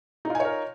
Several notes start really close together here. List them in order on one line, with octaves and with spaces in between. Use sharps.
D#4 F4 G#5 C#5 A#4